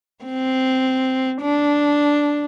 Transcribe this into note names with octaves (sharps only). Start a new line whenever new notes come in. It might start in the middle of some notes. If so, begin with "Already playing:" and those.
C4
D4